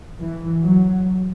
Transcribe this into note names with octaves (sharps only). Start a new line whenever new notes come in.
E3
F#3